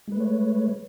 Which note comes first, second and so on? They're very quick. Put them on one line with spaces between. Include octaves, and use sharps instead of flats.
G#3 B4 A3 C#5